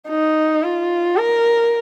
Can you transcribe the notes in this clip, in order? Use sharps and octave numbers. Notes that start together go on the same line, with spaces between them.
D#4
F4
A#4